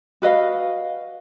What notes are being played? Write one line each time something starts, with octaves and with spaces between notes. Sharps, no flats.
F#4 B4 D#5 F5